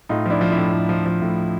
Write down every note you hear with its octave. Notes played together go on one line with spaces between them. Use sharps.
A2 D#4 F4
F3 D4 E4
F3
D4 E4
A2
A2
F3
F3
A2